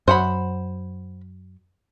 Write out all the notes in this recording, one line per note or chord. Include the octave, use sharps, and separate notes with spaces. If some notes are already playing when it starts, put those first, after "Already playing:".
F#2 C5 F#5 B5